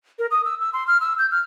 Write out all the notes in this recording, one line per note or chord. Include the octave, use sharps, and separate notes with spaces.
A#4
D#6
E6
E6
C6
F6
E6
G6
F6